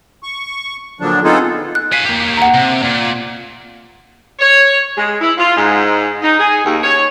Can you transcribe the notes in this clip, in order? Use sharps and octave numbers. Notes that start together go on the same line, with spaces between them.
C#6
A#2 D3 F3 F#3 D4
B3 C4 D#4 F4 G#4 A4
F#6
F5 G#5 B6
A#3 G4
F#5 A#5
C3
A#2
C#5
G#3
E4
F4
G#2
D#4
G#4
D#2
C#5